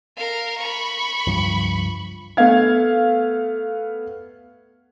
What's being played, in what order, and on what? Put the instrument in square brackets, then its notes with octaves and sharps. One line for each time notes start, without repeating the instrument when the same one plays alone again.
[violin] A#4 F5
B5 C#6
[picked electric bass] C#2 G2 F3
[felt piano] A3 B3 F5 G#6